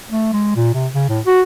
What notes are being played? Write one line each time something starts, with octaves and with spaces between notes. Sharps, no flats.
A3
G#3
A#2
C3
C#3
A2
F#4